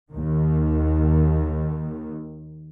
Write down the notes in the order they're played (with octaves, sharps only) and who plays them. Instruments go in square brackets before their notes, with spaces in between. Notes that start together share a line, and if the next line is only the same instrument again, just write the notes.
[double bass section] D#2 D#3